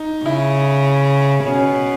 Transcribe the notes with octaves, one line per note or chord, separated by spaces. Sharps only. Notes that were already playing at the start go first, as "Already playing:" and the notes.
Already playing: D#4
C#3 E4
B2 C#4